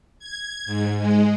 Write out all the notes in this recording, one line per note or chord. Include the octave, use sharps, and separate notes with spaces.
G#6
G#2
G#3